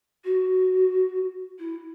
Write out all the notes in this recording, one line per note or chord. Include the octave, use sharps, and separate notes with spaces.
F#4
E4